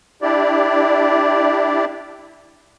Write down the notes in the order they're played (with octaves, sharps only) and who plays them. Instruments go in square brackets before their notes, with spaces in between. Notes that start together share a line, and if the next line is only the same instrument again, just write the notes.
[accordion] D4 E4 G4 D5